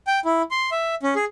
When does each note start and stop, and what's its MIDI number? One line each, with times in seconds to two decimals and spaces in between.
0.07 0.20 79
0.25 0.42 64
0.51 0.70 84
0.71 0.95 76
1.03 1.14 61
1.16 1.25 68